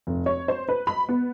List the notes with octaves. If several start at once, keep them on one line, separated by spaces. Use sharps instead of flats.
F1
C#5
C5
B4
B5
B3